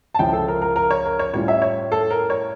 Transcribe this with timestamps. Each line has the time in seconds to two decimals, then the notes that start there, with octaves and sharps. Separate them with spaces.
0.14 A5
0.19 C#2 C#3 F3 C#4 E4 G5
0.33 A4
0.48 A#4
0.62 A#4
0.76 A#4
0.91 C#5
1.05 A#4
1.19 C#5
1.33 A2 G3 C#4 F4 C#5
1.48 E5
1.62 C#5
1.92 A4
2.11 A#4
2.30 C#5